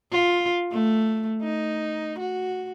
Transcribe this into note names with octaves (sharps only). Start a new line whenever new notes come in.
F4
A3
D#4
F#4